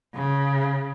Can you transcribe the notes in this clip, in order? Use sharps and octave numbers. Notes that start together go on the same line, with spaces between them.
C#3